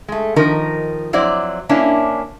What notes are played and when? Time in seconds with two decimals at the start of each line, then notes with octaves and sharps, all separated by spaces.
0.08 G#3 A3
0.36 D#3 F3 D#4 A#4
1.13 F2 F#3 E4 C5 D5
1.69 A#3 C#4 D4 E4